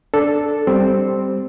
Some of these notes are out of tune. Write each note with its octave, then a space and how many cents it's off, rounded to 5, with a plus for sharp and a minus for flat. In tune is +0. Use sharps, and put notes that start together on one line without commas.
D4 +0 A4 +0
G3 +0 C4 +0